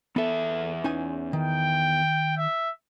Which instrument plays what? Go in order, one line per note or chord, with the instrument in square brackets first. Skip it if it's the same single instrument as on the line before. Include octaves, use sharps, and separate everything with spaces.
[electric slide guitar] E2 E5 [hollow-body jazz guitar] B3 A4
[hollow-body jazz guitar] C#4 D#4 G#5
[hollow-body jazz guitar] D#3 [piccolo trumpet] G5
[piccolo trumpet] E5